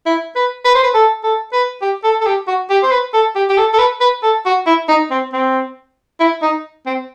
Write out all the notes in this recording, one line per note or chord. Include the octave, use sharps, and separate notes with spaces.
E4
B4
B4
C5
B4
A4
A4
B4
G4
A4
A4
G4
F#4
G4
C5
B4
A4
G4
G4
A4
A4
B4
B4
A4
F#4
E4
D#4
C4
C4
E4
D#4
C4